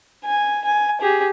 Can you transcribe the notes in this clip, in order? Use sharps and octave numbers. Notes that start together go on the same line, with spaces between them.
G#5
G#5
G4 G#4